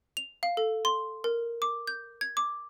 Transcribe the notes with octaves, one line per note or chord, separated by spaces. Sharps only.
F7
F5
A4
C6
A#4
D6
G6
G#6
D6